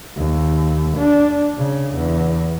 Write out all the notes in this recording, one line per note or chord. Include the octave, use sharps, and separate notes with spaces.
D#2
D4
C#3
E2